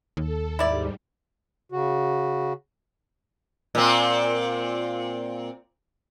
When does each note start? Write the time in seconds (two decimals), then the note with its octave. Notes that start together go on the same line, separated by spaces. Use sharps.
0.17 D#2 A4
0.59 G#2 G3 E4 D5
1.72 C#3 F#4
3.75 A#2 C4